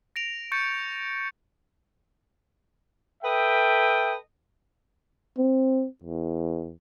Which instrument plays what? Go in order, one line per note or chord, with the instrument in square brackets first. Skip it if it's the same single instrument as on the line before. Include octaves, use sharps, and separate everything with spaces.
[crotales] A#6 D7 F7
C#6 G6 A6 C#7
[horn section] A4 B4 D#5 E5 G5
[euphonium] C4
E2